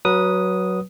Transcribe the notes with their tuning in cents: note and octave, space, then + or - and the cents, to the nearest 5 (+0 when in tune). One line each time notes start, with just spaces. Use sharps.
F#3 +5 B4 -20 D#6 +0